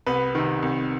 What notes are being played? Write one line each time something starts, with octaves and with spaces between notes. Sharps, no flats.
C2 B3 B4
C3 D#3
C2